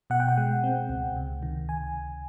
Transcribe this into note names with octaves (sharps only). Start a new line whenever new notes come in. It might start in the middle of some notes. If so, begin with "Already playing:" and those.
B2 F#5
G5
F#5
G#3
C4
C#2
C3
D#3
G#5